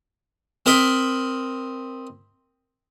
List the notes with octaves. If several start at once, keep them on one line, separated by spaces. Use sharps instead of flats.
C4 A#4 D#5 B5